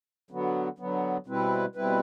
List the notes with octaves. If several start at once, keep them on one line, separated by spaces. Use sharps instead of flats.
D3 F#3 B3
D3 F#3 B3
B2 G3 C4 E4 B4
B2 G3 C4 E4 B4